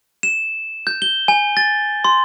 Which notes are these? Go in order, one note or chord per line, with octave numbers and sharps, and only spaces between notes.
E7
G6
G7
G#5
A6
C6